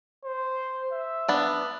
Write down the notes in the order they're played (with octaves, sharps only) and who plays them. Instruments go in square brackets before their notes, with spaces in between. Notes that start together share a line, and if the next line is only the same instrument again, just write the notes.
[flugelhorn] C5
E5
[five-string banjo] B3 D4